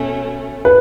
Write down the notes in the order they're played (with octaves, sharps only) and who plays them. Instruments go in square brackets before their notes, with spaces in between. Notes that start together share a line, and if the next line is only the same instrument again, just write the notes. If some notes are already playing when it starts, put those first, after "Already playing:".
Already playing: [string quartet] B2 A3 C#4
[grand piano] B4